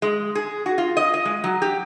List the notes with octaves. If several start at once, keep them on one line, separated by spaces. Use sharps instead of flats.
G#3
G#4
F#4
F4
D#5
D#5
G#3
F#3
G4